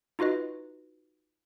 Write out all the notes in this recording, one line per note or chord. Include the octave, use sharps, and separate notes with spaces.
D#4 F4 F#4 B4 D#5